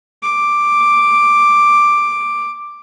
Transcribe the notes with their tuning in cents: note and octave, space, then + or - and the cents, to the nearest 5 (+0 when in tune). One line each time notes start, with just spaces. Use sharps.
D6 +5